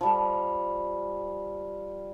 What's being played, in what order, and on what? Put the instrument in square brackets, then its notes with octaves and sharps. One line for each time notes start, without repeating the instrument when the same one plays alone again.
[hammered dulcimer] F3 G3